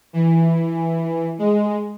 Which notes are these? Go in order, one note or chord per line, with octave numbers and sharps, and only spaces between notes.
E3
G#3